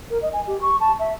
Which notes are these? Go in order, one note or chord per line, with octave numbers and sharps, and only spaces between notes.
A#4
D#5
G#5
G4
C#6
A5
E5